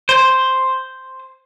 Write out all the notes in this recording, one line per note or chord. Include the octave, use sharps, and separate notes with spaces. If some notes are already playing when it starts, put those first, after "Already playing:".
C5